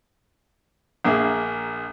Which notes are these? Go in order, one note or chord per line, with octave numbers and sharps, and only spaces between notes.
A#1 A#3 G#4 E5